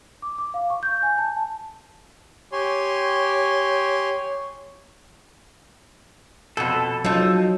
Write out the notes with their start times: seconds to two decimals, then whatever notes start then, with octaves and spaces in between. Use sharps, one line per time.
0.22 D6
0.38 D6
0.54 F5
0.70 C#6
0.83 G6
1.03 G#5
1.18 A5
2.52 G4 C#5 G#5 C6
6.57 F2 B2 A4
7.05 F3 F#3 D#4